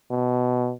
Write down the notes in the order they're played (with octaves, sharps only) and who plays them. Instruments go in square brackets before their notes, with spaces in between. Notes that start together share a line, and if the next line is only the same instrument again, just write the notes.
[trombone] B2